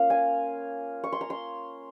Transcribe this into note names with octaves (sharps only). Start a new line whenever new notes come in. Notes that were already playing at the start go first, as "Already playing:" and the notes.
Already playing: A#3 C#4 F4 F5
G#5
C#6
C6
A#5
C6